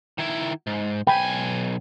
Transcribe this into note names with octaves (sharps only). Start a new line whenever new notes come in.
D#3 E4
G#2
B1 G5 G#5 B5